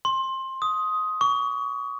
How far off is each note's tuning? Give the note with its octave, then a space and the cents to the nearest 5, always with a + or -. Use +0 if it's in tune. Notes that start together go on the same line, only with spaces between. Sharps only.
C6 +20
D#6 +10
C#6 +35